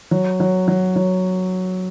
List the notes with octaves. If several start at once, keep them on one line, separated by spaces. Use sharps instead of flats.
F#3
F#3
F#3
F#3